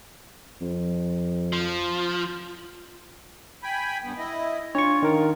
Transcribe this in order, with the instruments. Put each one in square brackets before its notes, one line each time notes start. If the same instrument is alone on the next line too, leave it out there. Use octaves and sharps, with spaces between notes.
[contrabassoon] F2
[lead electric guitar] F3
[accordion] G5 G#5 B5
G2 B3
E4 D#5
[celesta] D4 [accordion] F4 [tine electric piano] C#5 C#6
[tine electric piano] D#3 A#4